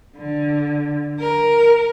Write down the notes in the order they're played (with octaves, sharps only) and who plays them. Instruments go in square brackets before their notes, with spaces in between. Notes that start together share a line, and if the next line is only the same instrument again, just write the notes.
[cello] D3
A#4